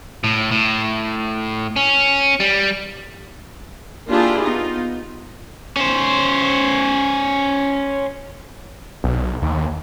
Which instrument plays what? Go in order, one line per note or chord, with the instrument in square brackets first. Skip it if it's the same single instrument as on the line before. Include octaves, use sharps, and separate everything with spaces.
[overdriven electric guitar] A2
A2
C#4
G3
[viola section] A#3 D4 E4 F4 G4 G#4
B3 D#4 F4
[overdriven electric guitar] C#4 C5
[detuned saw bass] B1
D#2